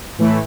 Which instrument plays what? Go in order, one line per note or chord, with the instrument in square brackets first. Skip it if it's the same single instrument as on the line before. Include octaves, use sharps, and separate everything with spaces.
[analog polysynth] A2 E3 A3 E4